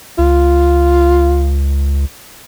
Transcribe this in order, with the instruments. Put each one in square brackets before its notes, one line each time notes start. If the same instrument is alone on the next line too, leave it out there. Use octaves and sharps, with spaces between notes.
[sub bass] C#2 [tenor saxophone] F4